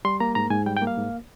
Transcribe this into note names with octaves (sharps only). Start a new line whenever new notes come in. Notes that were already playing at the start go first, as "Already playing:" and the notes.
G3 C6
A#3 A#5
G#2 A#5
G#2 G#5
G3 G5
G5
A#3
F5
G#2